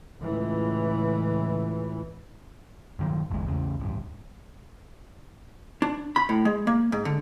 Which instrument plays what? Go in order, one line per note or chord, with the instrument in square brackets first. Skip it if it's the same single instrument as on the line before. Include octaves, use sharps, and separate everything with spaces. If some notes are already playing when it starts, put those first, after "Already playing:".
[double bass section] C#2 A2 E3
[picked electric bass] G2 D#3 F#3
G1 E2 E3 G#3
E2 C#3
D1 G2
[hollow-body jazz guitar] D4
B5
A2
G#3
A#3
G#2
D3